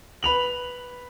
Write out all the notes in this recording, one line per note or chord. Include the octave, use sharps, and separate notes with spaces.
B4 B5 F7 F#7